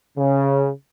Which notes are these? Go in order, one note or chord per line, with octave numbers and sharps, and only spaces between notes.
C#3